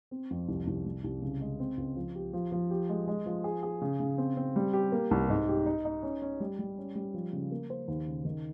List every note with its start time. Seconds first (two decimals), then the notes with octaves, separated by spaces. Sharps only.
0.11 C4
0.31 F2
0.48 C2
0.67 C2
0.85 G3
1.04 C2
1.22 C#3
1.41 G#3
1.60 C4
1.77 C#2
1.96 F3
2.15 G4
2.33 F3
2.52 F3
2.70 G4
2.89 G#3
3.08 G#3
3.26 F3
3.44 G#4
3.63 G#4
3.81 C#3
4.00 C#3
4.18 C4
4.37 C4
4.56 G3
4.73 G4
4.92 A#3
5.11 C2
5.29 G#2
5.48 G4
5.66 D#4
5.85 D#4
6.03 C#4
6.22 C#4
6.40 G3
6.59 G3
6.78 C#4
6.95 G3
7.14 F3
7.33 C#3
7.52 A#3
7.70 C5
7.88 D#2
8.07 C#3
8.25 D#3